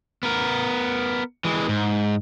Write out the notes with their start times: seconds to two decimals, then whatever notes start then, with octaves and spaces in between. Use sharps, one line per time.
0.23 B3 A#4
1.44 E3 G#3
1.69 G#2